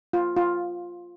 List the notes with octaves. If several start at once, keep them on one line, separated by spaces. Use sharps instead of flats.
F4
F4